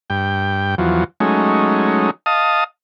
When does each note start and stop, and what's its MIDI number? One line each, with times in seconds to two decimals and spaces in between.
0.10 0.75 43
0.10 0.75 79
0.78 1.04 40
0.78 1.04 53
0.78 1.04 54
1.20 2.11 54
1.20 2.11 56
1.20 2.11 57
1.20 2.11 61
1.20 2.11 63
2.26 2.64 75
2.26 2.64 77
2.26 2.64 81
2.26 2.64 87